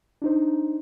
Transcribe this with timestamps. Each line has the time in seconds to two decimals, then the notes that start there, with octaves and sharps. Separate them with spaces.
0.22 D4 D#4 C5